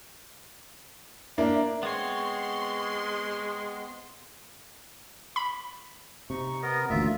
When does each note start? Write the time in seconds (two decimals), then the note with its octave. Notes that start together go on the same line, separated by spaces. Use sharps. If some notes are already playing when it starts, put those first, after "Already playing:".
1.38 A#3 D4 E5
1.83 G#3 B3 C4 C#5 C6
5.36 B5
6.30 C3 D#4 C#6
6.62 B3 A#4 D#5
6.90 A1 D2 A#2 F4 E5